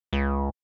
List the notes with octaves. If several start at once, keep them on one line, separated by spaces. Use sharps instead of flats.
C#2